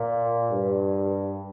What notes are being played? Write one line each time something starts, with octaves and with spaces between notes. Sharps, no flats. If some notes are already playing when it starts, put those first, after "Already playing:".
Already playing: A#2
G2